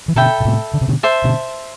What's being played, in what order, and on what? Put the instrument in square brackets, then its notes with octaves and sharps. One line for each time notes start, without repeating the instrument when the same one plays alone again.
[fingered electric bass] E3
[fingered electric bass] B2 D3 [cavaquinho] A4 E5 G5 B5
[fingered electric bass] B2
A2 C3
D3
C3
B2 D3
[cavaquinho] C5 E5 A5
[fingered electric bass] B2 D3